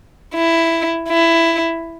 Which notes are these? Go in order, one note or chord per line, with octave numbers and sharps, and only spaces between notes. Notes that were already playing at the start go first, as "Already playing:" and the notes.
E4
E4